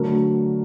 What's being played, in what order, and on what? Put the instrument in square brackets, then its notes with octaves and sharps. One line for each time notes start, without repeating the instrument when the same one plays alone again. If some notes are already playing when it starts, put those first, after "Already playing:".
Already playing: [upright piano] D3 F#3 A3 A#4